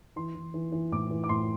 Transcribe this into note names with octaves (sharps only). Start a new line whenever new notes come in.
E3 C6
E3
E3
E3
A2 D6
E3
D6
A2 C6